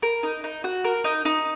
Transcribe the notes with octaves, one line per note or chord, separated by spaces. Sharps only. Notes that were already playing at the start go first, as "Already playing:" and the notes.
A#4
D#4
D#4
F#4
A#4
D#4
D#4